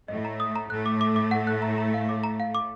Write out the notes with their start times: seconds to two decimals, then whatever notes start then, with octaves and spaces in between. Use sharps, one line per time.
0.08 A2 A3 D#5
0.25 A#5
0.40 D#6
0.56 A#5
0.70 A2 A3 F#6
0.86 D6
1.01 D6
1.16 D6
1.31 F#5
1.47 F#6
1.62 A#5
1.78 A#5
1.94 F5
2.09 D6
2.24 A#5
2.40 F5
2.55 D6